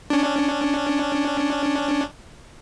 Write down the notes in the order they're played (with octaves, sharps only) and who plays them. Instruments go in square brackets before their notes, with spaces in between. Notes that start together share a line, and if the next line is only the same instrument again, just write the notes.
[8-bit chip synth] C#4 D4